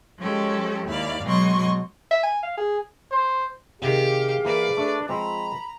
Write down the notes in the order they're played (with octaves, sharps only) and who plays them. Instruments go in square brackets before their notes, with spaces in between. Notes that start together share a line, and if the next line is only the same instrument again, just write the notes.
[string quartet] F3 G#3 C#4 G4 A4
D#2 E4 D5 F5
B2 F#3 G#3 D#5 C6 C#6
[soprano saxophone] E5
G#5
F5
G#4
[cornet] C5
[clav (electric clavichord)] C3 D#3 [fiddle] G4 [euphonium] G#4 [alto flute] F5
[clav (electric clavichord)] E3 A#3 [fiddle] B4 D5
[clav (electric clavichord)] A3 [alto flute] D4
[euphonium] F3 [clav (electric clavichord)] G#3 C4 [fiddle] A#5 [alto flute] B5